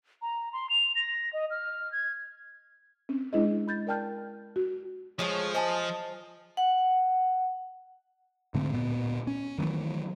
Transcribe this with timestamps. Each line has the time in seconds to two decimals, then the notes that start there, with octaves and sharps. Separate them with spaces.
0.22 A#5
0.53 C6
0.70 F7
0.96 A#6
1.33 D#5
1.51 F6
1.92 G#6
3.09 C4 C#4
3.33 G#3 D4 E4 G#4 B4 D#5
3.68 B5 G6 A6
3.87 A#4 D5 G5 A5 F6 G6
4.56 F#4
5.19 F3 G#3 A3 G#4 C#5
5.55 C5 D#5 G#5 A5
6.57 F#5
8.54 G#2 D3 A3 C4
8.74 D1 A#2 B3
9.27 C#4
9.58 D#3 E3 F#3 A3